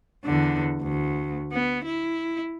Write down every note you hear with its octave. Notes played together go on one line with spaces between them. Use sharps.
E2 D3
D2
B3
E4